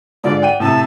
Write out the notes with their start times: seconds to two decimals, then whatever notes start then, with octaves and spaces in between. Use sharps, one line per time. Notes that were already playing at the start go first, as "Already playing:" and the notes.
0.24 G#2 D3 F4 D5
0.42 F#5 G5 D#7
0.60 A2 C3 A5